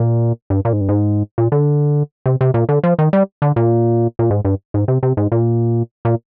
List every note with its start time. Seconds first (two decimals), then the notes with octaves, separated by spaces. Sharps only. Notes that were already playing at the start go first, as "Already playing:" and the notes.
Already playing: A#2
0.50 G2
0.65 A#2
0.73 G#2
0.81 G2
0.89 G#2
1.38 A#2
1.52 D3
2.26 C3
2.41 C3
2.54 A#2
2.69 D3
2.84 F3
2.99 D#3
3.13 G3
3.42 D3
3.56 A#2
4.19 A#2
4.30 G#2
4.45 G2
4.74 G#2
4.88 C3
5.03 C3
5.17 G#2
5.32 A#2
6.05 A#2